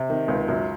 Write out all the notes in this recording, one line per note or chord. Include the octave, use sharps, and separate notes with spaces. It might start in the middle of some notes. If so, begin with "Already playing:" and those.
Already playing: C3
D#3
C#2
F#2